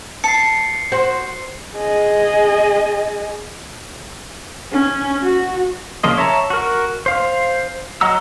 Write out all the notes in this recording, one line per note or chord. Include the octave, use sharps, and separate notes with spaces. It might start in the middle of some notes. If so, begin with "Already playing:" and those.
A5 C7 C#7
F#4 C5
G#4 D#5
C#4
F#4
C#3 F3 A#3 F4 D#5
C#5 E5 A5 A#5
F#4 A#4
C5 F5
F#3 D#5 F#5 A#5 E6